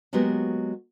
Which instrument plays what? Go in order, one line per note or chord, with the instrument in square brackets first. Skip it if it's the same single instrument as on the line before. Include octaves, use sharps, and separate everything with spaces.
[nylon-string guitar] F#3 G#3 A#3 B3 F#4 G4